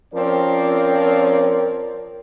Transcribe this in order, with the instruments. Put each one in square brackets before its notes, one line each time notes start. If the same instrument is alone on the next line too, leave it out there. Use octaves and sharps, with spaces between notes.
[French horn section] F3 C4 C#4 A#4 C#5 D5